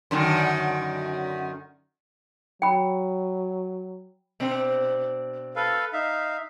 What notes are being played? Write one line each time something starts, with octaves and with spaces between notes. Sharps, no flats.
F#2 D3 D#3
F#3 G5 B5
B2 C4 D4
A4 B4 F5
D#4 E5 F5